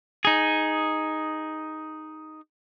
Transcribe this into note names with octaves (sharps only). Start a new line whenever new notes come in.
D#4 G#4